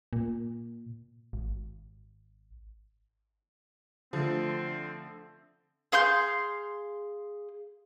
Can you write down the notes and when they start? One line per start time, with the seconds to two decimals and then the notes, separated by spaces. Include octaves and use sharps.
0.13 A#2
1.33 G#1
4.13 D3 F3 A3 C4
5.92 G#4 F5 C6 G6